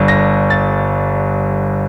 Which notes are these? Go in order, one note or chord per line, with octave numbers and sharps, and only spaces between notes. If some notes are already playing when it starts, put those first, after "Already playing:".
Already playing: G1 G2 D3
A#6
A6